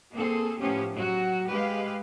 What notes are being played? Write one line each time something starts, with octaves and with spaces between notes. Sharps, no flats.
A#3 C4 G#4 A4
A2 F3 B3 C#4 G4
F#3 F#4
G#3 G4 B4 F5